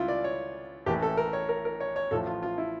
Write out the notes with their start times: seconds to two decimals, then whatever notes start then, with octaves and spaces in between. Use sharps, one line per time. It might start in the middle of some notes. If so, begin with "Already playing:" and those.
Already playing: C#2 C#3 G3 E4 F4
0.08 D5
0.24 C#5
0.86 A1 A2 E3 A#3 G4
1.02 A4
1.17 A#4
1.33 C#5
1.49 A#4
1.65 A#4
1.80 C#5
1.96 C#5
2.11 A1 A2 F3 A4
2.27 F4
2.43 F4
2.58 E4